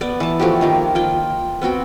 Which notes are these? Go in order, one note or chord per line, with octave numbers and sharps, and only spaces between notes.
B3 D5
E3 A5
F3 A3 F#4 G4
D#3 F3 A#3
F4 G5
B3 C4 F#4 G5